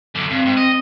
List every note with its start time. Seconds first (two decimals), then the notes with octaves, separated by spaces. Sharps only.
0.15 F#2 D3
0.30 G2 C4
0.46 G#2
0.57 D#5